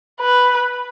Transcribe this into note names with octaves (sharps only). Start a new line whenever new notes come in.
B4